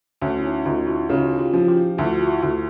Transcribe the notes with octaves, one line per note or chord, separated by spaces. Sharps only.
D2 C#4
E4
C#4 D#4
D2 D#4 F4
E4 F#4
C#3 D#4 F4
F4 G4
F3
F4 G4
D2 E4 F#4
F4
E4 F#4
D2